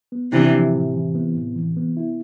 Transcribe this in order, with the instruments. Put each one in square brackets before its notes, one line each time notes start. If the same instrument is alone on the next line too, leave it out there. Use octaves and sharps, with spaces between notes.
[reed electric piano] B3
[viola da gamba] C3 E3 [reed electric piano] D4
[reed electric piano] F3
A2
E3
B3
A2
E3
B3
E4